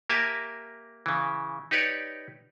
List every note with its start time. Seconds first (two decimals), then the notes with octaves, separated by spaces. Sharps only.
0.10 A#3 G4 A#4 E5 G#5 A5
1.06 C#3 E3
1.71 D#4 G4 B4 C#5 D5